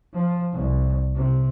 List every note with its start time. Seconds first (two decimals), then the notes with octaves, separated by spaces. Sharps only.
0.13 F3
0.53 C2
1.15 C3